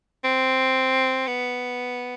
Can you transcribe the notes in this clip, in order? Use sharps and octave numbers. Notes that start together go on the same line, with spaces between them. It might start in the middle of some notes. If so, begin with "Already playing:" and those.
C4
B3